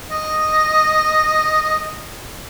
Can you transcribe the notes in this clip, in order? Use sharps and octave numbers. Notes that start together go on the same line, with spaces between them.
D#5